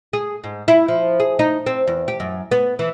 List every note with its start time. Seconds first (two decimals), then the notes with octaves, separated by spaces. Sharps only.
0.13 G#4
0.44 G#2
0.68 E4
0.88 F3
1.20 G#4
1.39 D#4
1.66 C4
1.87 E2
2.08 G4
2.20 F#2
2.51 B3
2.79 E3